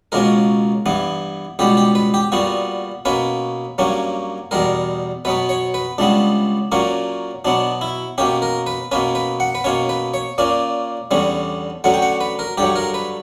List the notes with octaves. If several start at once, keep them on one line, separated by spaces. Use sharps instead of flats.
C#2 B2 A#3 C#4 A#4
G2 E3 B3
C#2 B2 G3 B3 G4
G4
B4
G4
A#2 G3 B3 F#4
B2 A#3 C#4 B4
G2 F#3 A#3 C#4
E2 B2 G3 A#4
B2 F#3 B3 B4
C#5
B4
C#2 C#3 G3 B3 D4
A#2 F#3 A#3 C#4
B2 F#3 B3 D4
E4
B2 A#3 C#4 G4
A#4
B4
B2 A#3 C#4 B4
B4
F#5
B4
B2 A#3 C#4 C#5
B4
C#5
A#2 A#3 C#4 D5
E2 D3 G3 C#4
D2 D3 F#3 C#4 F#5
G5
F#5
B4
A#4
G2 D3 F#3 G4
A#4
B4